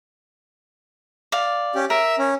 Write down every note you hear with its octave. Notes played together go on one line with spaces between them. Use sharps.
D5 F5
C#4 G4
A#4 E5
C#4